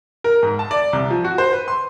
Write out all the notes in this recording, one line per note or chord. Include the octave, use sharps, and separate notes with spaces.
A#4
G#2
A5
D5
C2
F3
F#4
C5
B4
C6